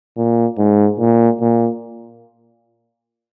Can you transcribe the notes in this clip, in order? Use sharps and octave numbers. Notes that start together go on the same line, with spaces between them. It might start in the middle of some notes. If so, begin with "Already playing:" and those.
A#2
G#2
A#2
A#2